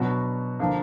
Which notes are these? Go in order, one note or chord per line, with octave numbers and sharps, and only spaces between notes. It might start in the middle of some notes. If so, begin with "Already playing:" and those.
Already playing: B2 F#3 B3 D4 F#4
D3 F3 A#3 D4